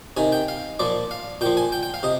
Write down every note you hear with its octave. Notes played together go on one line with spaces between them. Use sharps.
C3 D#3 G#5
G5
F5
A#2 F3 D5
F5
A#2 F3 G5
G#5
G5
G5
F5
C3 D#5